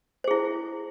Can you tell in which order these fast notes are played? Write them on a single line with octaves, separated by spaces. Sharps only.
C5 G#4 E4